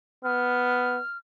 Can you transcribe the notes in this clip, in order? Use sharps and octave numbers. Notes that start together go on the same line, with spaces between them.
B3 F6